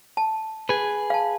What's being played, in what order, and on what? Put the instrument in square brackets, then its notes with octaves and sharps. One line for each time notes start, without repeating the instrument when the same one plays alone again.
[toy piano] A5
[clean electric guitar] G#4 B4
[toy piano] F5 A5